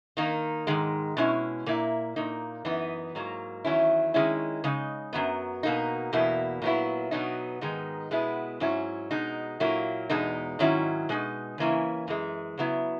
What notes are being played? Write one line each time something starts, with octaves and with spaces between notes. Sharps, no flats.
D#3 A#3 D#4
G#2 D#3 G#3
B2 G#3 C#4 E4
A#2 A#3 E4
A#2 A#3 D#4
F#2 E3 B3 D#4
G#2 F#3 A#3
E2 D#3 F#3 C#4 E4
D#3 G#3 C#4 E4
C#3 G#3 D#4
F#2 C#3 F#3 B3
B2 A#3 D#4
E2 B2 A#3 E4
A#2 F#3 B3 E4
B2 F#3 B3 D#4
G#2 D#3 G#3 B3 D#4
B2 G#3 B3 E4
G#2 F#3 C#4 E4
B2 G#3 D#4
A#2 F#3 A#3 E4
E2 B2 G#3 D#4
G#2 D#3 F#3 C#4 E4
B2 G#3 D#4
C#3 E3 A#3 C#4 E4
F#2 E3 G#3
C#3 F#3 B3 E4